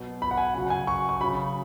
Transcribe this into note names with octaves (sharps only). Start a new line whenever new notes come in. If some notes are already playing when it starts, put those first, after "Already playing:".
Already playing: B2 F#3
B5
F#5
G#5
C#3 F#3 F#5
G#5
C#6
C#6
C#3 F#3 B5